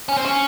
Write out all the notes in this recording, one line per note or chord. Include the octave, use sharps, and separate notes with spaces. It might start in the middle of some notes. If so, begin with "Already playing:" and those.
C#4
C4
C#4